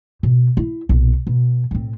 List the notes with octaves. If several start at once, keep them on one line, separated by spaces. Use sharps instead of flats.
B2
E4
B1 A#2
B2
A2 C4